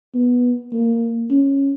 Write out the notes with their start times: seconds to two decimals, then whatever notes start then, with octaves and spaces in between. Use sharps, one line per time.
0.15 B3
0.72 A#3
1.31 C#4